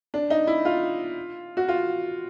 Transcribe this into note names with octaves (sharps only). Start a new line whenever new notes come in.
D4
D#4
E4
F4
F#4
F4